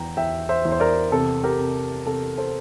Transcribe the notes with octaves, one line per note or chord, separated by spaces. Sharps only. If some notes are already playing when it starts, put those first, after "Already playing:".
Already playing: E2 G5 A#5
E2 E5 G5
C5 E5
E2
C5
A#4 D5
C3 A4
G4 A#4
C3
C3 A4
A4 C5